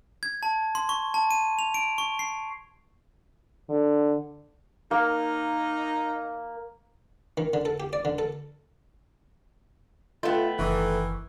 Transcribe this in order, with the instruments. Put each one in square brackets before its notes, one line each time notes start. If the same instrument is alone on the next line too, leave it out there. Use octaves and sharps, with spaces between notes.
[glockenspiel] G#6
A5
C6
C#6
A5
D#7
F7
D7
C#6
C7
[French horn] D3
[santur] A#3 [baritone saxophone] D#4
[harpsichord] D#3
D3
A4
G4
D5
D3
A4
[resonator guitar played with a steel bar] A3 B3 [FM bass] F4 [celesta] D#5 G5
[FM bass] F#1 [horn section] D#3 E3 [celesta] C#6 E6